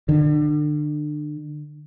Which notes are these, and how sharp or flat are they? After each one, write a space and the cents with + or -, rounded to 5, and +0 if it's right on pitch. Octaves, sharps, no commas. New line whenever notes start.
D3 +30